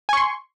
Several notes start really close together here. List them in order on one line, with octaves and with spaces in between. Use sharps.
G#5 C#6 C6